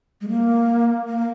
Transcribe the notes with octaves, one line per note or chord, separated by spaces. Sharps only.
G#3
A#3
A#3